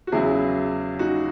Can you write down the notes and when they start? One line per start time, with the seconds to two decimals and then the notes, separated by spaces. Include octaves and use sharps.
0.07 F#4
0.12 E2 C#3 F#3 E4 G#4
0.99 D#4 F#4